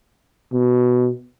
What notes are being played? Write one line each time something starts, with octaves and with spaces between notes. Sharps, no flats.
B2